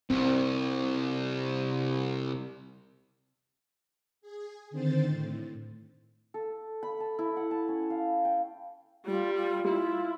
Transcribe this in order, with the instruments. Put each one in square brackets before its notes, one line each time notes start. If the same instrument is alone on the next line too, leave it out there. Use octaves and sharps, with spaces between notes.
[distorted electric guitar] C2 [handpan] C4
[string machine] G#4
D3 D#3 C4 C5 A6
A2
[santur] A4
B5
A5
E4
F#5
A5
C#4
F5
G5
[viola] G3 [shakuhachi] F4
[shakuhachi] F4
[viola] E4